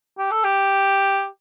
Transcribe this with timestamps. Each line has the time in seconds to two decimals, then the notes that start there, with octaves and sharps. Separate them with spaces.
0.18 G4
0.31 A4
0.44 G4